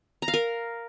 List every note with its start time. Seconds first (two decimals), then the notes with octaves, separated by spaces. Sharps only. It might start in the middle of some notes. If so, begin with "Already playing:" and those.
0.22 A#5
0.28 F5
0.34 A#4